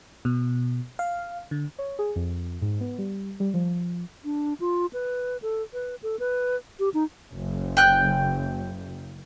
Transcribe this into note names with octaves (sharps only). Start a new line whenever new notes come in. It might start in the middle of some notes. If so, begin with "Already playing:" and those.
B2
F5
D3
C#5
G#4
F2
G#2
B3
G3
G3
F3
D4
F4
B4
A4
B4
A4
B4
G4
D#4
F#1
G5 F#6